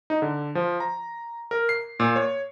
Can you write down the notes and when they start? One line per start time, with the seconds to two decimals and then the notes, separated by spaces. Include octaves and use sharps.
0.10 D#4
0.22 D3
0.55 F3
0.80 A#5
1.51 A#4
1.69 C7
2.00 A#2
2.16 C#5